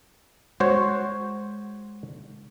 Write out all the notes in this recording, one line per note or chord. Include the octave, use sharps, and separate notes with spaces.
G#3 F#4 C5 C#5